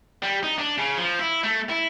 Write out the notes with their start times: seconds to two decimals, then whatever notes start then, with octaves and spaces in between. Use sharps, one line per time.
0.23 G3
0.43 D#4
0.58 D4
0.78 C#3
0.98 F3
1.19 E4
1.43 A3
1.69 E4